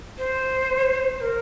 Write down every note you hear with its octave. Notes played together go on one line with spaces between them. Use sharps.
C5
C5
A#4